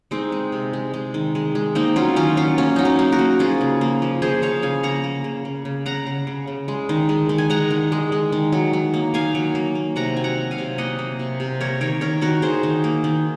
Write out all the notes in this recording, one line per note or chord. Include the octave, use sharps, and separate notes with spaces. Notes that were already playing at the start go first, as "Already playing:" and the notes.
G#3 C4 D#4
G#3
C3
G#3
G#3
D#3
G#3
G#3
A#3 C4 D#4
F#3 C#4 F4
D#3 C#4 F4
F#3 C#4 F4
A#3 C#4
F#3 D#4
C#4
A#3
F#4 A#4
A#3
F3 F4 G#4
C#3
A#3
F3
F3 G#4 C5
F3 C#5 F5
C#3 F5 G#5
A#3 F#5 A#5
A#3
C#3
C#3
C#3
C#3 F#5 A#5
C#3
C#3
C#3
G#3
D#3
G#3
D#3
G#5
G#3 F#5 A#5
D#3
G#3
G#3
D#3
F#3
F#3
A#3
D#3 F5 G#5
F#3
A#3
A#3
C3 F#5 A#5
F#3 G#5
F#5 A#5
F#3
F5 G#5
C3
A#3 D#5 F#5
A#3
C3
C3
A#3 A#4 C#5
D#3 A#4 C#5
D#3 A#4 C#5
D#3 F#4 A#4
D#3 G#4 C5
D#3
A#3
D#3